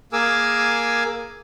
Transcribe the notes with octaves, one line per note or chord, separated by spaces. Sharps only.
A#3 G#4 A#4 G#5 D6 E6